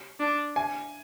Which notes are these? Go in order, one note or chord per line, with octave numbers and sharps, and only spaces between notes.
D4
G#5